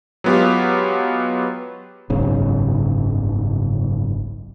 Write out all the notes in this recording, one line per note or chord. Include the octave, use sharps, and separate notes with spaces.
F#3 G#3 B3 F4 G4
F#1 B1 G#2 C#3